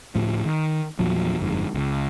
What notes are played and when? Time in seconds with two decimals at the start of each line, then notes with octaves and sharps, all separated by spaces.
0.15 D2 A2 F3
0.45 D#3
0.99 E2 A#2 F3 F#3
1.39 G1 F2 G#2
1.75 C#2 C#3